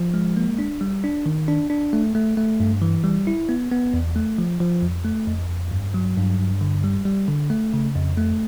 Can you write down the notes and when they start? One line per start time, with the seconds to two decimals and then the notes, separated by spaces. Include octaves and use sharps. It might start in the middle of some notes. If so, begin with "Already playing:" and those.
Already playing: F3
0.14 G#3
0.37 A#3
0.59 D4
0.81 G3
1.04 D4
1.26 D#3
1.48 D4
1.70 D4
1.93 A3
2.15 A3
2.37 A3
2.60 G2
2.82 E3
3.04 G3
3.27 E4
3.49 B3
3.72 B3
3.94 E2
4.16 A3
4.38 F3
4.60 F3
4.82 F2
5.05 A3
5.28 F2
5.50 F2
5.71 G2
5.94 F#3
6.17 G2
6.39 G2
6.61 D3
6.84 G3
7.05 G3
7.28 D3
7.50 A3
7.73 C#3
7.95 F2
8.18 A3